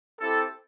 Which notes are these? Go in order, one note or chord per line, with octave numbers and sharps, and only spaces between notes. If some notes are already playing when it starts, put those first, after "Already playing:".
C4 E4 G4 A4